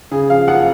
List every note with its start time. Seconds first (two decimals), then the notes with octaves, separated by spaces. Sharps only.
0.11 C#3 G#4
0.30 F3 F5
0.48 F#1 F#5